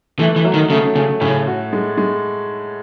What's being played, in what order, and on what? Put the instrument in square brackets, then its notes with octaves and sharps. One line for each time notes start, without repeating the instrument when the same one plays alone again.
[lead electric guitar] E3 [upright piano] A3
[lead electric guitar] E3
[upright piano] F#3
[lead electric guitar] D#3
[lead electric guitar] C#3 [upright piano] A3
[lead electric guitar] C#3 [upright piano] A3
[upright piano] A2 [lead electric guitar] C#3
[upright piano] F#4
G#3
G#3